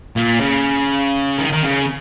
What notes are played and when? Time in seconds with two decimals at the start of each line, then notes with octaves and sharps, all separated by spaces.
0.16 A#2
0.41 C#3
1.39 D#3
1.53 D#3
1.64 C#3